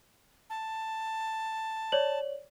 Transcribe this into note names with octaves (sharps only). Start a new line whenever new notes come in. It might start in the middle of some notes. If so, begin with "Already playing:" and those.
A5
C#5 D5 F#7